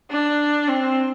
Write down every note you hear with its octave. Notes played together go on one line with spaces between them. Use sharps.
D4
C4